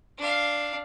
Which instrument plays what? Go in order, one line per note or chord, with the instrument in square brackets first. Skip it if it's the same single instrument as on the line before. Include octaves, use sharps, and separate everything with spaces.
[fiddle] D4 F5